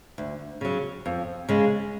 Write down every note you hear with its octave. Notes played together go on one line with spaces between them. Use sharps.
D2
C#3 F#3
F2
C#3 G#3